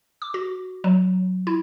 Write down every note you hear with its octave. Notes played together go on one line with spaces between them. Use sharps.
D6
F#4
F#3
E4